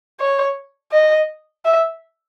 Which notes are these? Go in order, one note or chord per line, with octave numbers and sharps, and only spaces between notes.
C#5
D#5
E5